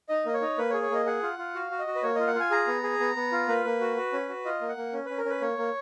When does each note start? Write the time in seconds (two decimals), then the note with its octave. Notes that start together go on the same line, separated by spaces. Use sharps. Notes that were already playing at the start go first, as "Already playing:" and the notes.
0.09 D#4 D#5
0.26 A#3 D#5
0.34 C#5
0.42 D#4
0.58 A#3 B4
0.70 C#5
0.74 G#4
0.82 C#5
0.90 A#3 D#5
1.06 G#4 F#5
1.23 F4
1.38 F4
1.55 F#4 F5
1.71 F#4
1.79 D#5
1.87 F#4
1.95 B4
2.03 A#3 C#5
2.15 F4 D#5
2.27 F#5
2.35 F4
2.40 G#5
2.51 G#4 A#5
2.67 B3
2.83 G#4
3.00 B3
3.16 B3
3.32 F4
3.48 A#3 B4
3.65 A#3
3.81 F#4
3.97 F#4
4.13 C#4
4.29 F#4
4.45 F4 D#5
4.61 A#3
4.69 F#5
4.77 A#3
4.93 C#4
5.06 C#4 B4
5.18 A#4
5.25 C#4 B4
5.41 A#3 C#5
5.58 A#3